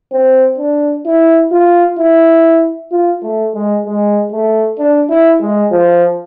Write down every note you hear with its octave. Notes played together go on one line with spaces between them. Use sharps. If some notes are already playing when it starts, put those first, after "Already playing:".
C4
D4
E4
F4
E4
F4
A3
G#3
G#3
A3
D4
E4
G#3
F3